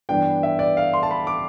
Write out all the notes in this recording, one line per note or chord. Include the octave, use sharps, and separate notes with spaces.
G2 E3 B3 D4 G5
E5
D5
F5
C6
A5
B5
D6